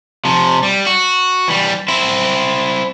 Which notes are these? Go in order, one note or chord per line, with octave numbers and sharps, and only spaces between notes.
C3 F3
G3
F#4
E3 G3
C4 E4